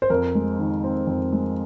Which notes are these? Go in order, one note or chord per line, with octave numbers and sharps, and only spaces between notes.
C5
F2 A#4
G#3
D#3
C4
F2
G#3